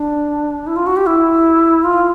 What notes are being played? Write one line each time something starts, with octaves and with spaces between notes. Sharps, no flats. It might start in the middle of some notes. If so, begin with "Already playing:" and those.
Already playing: D4
E4
F4
F#4
G4
E4
F4